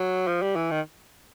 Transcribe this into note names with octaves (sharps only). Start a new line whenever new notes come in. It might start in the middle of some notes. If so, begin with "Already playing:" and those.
Already playing: F#3
F3
G3
E3
D#3